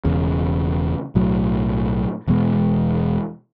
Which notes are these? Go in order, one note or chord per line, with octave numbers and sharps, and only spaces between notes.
E1 E2 C#3
B1 A2 F#3
E1 E2 B2 G#3